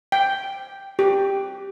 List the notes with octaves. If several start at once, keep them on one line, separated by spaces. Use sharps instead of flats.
G5
G4